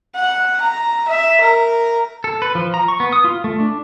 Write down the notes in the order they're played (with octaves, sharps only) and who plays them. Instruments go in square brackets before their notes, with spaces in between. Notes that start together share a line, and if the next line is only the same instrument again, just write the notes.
[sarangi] F#5
A#5
E5
A#4
[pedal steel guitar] A4
B4
F3
A#5
C#6
B3
D#6
F4
A3
D4